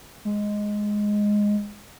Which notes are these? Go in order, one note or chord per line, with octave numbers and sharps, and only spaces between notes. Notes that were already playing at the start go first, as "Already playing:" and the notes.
G#3